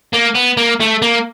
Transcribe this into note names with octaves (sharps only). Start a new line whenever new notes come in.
A#3
B3
A#3
A3
A#3